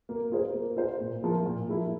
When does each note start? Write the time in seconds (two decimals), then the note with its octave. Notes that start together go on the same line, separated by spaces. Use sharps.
0.09 A#3
0.32 F4 G#4 C5
0.54 A#3
0.77 F4 G#4 C5
1.00 A#2
1.22 F3 A#3 E4 G#4
1.46 A#2
1.69 F3 A#3 E4 G#4